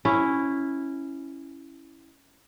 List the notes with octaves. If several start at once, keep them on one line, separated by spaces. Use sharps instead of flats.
C#4 E4